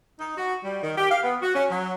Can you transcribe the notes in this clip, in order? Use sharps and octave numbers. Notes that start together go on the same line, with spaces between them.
D#4
F#4
G3
D#3
G4
F5
B3
F#4
C#4
F#3